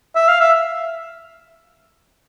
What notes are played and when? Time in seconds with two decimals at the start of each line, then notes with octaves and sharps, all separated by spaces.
0.16 E5
0.28 F5
0.40 E5